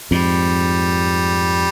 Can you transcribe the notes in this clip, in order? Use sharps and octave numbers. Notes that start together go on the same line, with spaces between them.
F2 G#2 G3